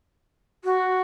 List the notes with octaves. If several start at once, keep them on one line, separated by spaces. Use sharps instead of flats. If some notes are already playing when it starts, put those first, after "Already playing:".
F#4